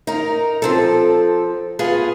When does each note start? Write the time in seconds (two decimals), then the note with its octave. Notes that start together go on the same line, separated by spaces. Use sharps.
0.07 D#4 A#4
0.62 F3 C4 A4
1.79 B3 F4 G#4